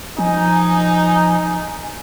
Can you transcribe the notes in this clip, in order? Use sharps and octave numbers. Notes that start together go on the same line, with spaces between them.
F3 D#4 G#5